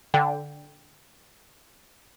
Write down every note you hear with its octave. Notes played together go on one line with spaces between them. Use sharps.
D3 G5